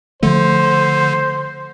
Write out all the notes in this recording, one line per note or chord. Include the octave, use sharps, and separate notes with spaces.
D3 F3 A3 C5